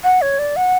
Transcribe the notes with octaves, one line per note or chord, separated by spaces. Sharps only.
F#5
C#5
D5
F#5